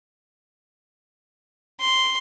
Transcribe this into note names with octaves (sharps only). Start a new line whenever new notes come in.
C6